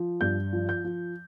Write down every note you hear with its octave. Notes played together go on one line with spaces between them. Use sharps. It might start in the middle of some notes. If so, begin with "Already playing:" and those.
Already playing: F3
G2 G6
F3
G6
F3